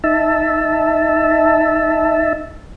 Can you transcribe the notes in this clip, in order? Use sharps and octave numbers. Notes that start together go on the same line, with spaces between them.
D#4 E5 A5